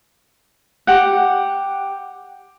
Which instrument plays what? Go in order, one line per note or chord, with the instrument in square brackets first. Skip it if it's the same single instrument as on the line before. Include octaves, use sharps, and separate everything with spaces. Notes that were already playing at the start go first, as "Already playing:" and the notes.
[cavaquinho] G4 F#5